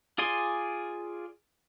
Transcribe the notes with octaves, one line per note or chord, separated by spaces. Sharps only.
F4 G#4 D5 G#5 C6